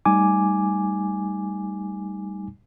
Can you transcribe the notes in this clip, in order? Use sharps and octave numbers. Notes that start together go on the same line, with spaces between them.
G3 A3 D#4 G#5 D6